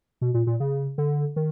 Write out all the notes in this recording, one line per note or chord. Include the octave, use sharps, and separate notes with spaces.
B2
A#2
A#2
C#3
D3
D#3